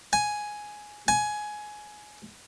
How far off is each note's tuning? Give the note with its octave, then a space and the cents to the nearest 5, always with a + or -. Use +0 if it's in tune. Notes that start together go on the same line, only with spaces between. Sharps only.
G#5 +5
G#5 +15